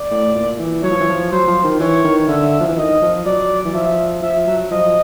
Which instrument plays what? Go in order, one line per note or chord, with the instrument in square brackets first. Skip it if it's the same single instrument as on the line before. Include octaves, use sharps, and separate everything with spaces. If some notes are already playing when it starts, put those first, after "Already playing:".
Already playing: [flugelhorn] D5
[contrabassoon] A2
A#2
E3
[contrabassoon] F#3 [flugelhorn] C#5
[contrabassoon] F3
E3
F3
[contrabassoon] F#3 [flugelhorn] C5
[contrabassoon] F3
D#3
[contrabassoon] E3 [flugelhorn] C#5
[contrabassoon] D#3
[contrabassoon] D3 [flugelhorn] E5
[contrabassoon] F3
E3
[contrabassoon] D#3 [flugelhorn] D#5
[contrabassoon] F3
[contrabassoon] F#3 [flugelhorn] D5
[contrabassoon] E3
[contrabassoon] F3 [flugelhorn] E5
[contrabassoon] F3 [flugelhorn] E5
[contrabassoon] F#3
[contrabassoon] F3 [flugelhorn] D#5